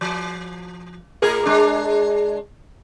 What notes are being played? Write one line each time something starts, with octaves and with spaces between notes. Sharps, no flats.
F3
A2 G#4 A#4
G#3 D4